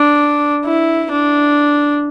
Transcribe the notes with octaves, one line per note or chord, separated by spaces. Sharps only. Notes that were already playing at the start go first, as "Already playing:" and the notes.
Already playing: D4
E4
D4